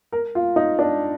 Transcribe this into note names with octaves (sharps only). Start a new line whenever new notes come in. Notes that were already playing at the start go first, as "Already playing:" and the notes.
A#4
F4
D#4
D4